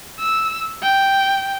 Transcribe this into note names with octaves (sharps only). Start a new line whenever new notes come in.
E6
G5